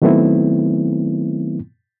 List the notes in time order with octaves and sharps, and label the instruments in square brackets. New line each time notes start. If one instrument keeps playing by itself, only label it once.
[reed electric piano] D#3 F#3 A3 B3 C4 E4